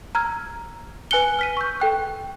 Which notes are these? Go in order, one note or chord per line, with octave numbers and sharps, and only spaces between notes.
A#5 E6 F6 G#6
B4 G#5 F#6 C#7 G7
F6 B6 D#7
C#6 E6 G6
A4 G5 F#6